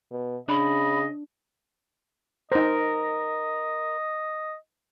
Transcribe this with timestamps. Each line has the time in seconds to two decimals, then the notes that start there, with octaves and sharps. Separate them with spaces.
0.11 B2
0.48 C#3 D4 D#5 B5
2.52 D#4 A#4 C5 D#5